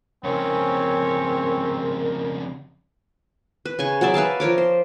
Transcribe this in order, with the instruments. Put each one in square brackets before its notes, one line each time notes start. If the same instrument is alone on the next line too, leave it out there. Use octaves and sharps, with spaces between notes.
[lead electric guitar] F2 C#3 [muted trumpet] C4 [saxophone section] C#4 C#5 [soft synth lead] A#4
[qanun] B4
C#3 G#5 C#6
F#3 G#4 D5 E5
B4 E5 F5 A5
F3 A#4 C#5 D6
C5